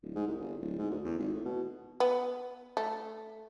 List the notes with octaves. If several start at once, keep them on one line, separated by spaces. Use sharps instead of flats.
D1
G#2
C2
G1
D1
G#2
D2
E2
G#1
A2
B2
B3
A3